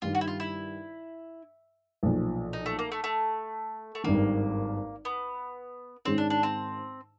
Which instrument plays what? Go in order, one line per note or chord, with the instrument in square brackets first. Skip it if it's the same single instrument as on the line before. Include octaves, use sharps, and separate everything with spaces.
[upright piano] G2 D#3 G3 [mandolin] F4
[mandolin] F#4
E4
F4
E4
[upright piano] B1 A#2 F3
[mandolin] D#4
A3
A#3
A3
A3
A3
[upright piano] G#1 G2 D#3 [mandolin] A#3
[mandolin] B3
[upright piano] G#2 D#3 G#3 C#4 [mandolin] C4
[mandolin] D4
D4
C4